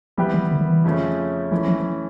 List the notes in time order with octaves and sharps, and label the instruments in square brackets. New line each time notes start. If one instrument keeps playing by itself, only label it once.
[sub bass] F3 [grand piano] G3 B3 E4 G4 B4
[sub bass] E3
D3
D#3
E3
[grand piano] F2 C#3 F3 A3 C#4
[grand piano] E3 A3 C#4 E4 [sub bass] F3
[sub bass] F3